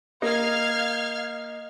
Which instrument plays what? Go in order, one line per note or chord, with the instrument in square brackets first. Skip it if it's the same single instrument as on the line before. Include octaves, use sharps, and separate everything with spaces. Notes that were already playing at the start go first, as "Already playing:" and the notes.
[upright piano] A#3 [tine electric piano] D#5 [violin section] F5 F6 G#6